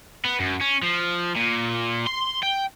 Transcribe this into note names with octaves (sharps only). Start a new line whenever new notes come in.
B3
F#2
C#4
F3
A#2
C6
G5